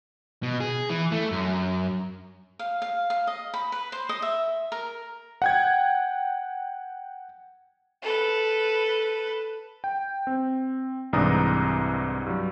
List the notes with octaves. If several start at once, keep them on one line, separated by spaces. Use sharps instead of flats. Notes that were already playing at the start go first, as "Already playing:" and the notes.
B2
G#4
E3
A3
F#2
F5
F5
F5
D#5
B5
B4
C5
D#5
E5
A#4
F#5 G5 G#6
A4 B4
G5
C4
C2 G#2 E3 D4 A#5 D#6
G2 F#3